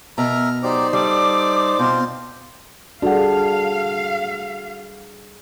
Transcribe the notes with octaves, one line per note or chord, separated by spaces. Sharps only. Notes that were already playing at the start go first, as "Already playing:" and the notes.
B2 A#4 E5 A#5 F6
F#3 D#4 G4 C5 D5 D6
G3 A4 D6
B2 C4 F4 C5
G3 D4 F#4 G#4 A4 F5 F#5